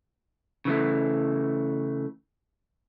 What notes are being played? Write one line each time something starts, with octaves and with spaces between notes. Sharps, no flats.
C#3 E3 A3